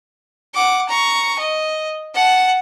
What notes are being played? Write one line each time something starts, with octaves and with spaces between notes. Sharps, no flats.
F#5 D6
A#5 C#6
D#5
F#5 A5